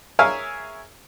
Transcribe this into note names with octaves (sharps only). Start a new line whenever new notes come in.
G#4 A#4 C#5 E5 F5 G#5